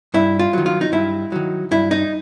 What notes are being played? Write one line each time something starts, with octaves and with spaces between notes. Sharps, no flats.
G2 E4
F4
D#3 F#3
F4
D#4
G2 E4
D#3 F#3
G2 E4
D#4